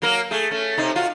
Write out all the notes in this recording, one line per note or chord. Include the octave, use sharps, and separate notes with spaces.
F#3 A#3 A#4
A3 G#4
A3 C#4
C3 D#4
F4 F#4